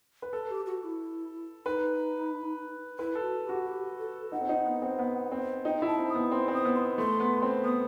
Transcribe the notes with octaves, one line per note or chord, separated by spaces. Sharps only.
B4
A4 B4
G4
F#4
E4
D#4 B4
E4 B4
A4
F#4
G4
F#4
G4
A4
D#4 F#5
C4
D#4
B3
C4
B3
C4
D#4 G5
E4
A5
C4
D#6
B3
C4 C6
C4
D#6
B3
C6
A3 C6
B3
C4
B3 D#6